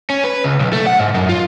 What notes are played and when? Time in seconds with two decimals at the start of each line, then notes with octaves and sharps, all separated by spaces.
0.10 C#4
0.24 B4
0.44 C#2
0.60 B1
0.73 A3
0.87 F#5
0.99 G#2
1.15 F#2
1.29 F4